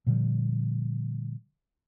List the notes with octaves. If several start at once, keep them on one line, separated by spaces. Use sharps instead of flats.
A#2 D3 F3 G3